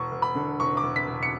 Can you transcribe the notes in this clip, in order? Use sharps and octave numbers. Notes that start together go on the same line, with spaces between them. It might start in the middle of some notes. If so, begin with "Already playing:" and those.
Already playing: E1 C#6
E1
B5
D3
E1 C#6
D6
E1
B6
E1
C#7